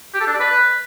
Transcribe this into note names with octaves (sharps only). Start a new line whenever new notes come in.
G4
A4
D4
D5
B4